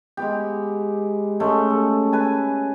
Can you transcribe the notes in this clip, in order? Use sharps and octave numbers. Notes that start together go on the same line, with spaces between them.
G#3 B3 G4
G#3 A3 C#4
A4
B4 G#5 A5